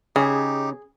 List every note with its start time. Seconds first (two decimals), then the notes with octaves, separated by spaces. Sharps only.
0.16 C#3 D#4 G4 G#4